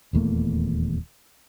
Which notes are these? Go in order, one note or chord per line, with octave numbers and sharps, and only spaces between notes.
D#1 E2 A3 A#3